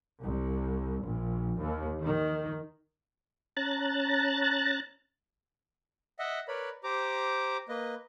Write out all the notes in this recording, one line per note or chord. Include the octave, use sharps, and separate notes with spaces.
C2
A#1
D#2
D#3
C#4 A5 A#5 F#6 A6
D#5 E5 F#5
A#4 B4 C#5 D5 B5
G4 C5 A#5 D6
A#3 B4 D#5